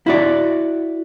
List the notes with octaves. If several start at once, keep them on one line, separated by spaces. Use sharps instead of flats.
E4 F#4 D5